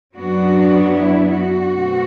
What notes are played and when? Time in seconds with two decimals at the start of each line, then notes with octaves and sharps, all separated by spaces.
0.15 F#2 F#3 B3 D4 F#4
0.94 E4
1.33 F#4
1.71 B2 A3 C4